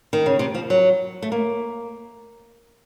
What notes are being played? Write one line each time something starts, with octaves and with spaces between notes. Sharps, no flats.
D#3
C#3
C3
F3
F#3
A3
A#3